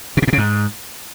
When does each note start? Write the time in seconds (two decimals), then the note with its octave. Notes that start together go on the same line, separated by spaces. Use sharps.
0.17 B2
0.22 C3
0.27 A2
0.33 C#3
0.38 G#2